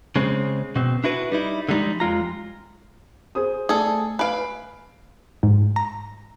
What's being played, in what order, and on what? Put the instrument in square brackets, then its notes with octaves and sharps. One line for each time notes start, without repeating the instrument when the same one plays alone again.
[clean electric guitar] C#3 G#3 C4
B2 C4
D4 E4 F#4 B4
G3 D#4 E4
D3 F3 G3 G#3 D#4
F2 G#3 F4 A#5
[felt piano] G#4 C5 D#6
[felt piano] A3 D5 [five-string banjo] G#4 A4
[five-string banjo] B4 F5 [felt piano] G#5 D7
[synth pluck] G#2
A#5